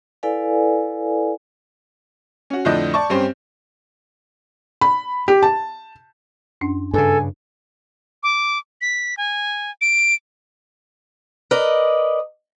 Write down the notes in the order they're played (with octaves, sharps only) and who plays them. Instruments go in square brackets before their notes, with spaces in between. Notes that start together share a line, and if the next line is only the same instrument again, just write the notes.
[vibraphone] E4 A4 B4 D5 F5 G#5
[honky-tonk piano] C#4 F#4
F2 A2 D3 D4 D#5 G6
D5 A5 C#6
G2 C4 C#4 G4 C5
[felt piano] B5
G4
A5
[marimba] F#2 C#4 D4
[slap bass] G2 C#3 [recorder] A4 [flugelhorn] G#5
[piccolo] D6
B6
G#5
D7
[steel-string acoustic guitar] A#4 B4 D5 D#5